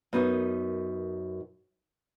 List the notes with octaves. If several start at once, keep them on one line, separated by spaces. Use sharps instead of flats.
F#2 B3 D#4 A#4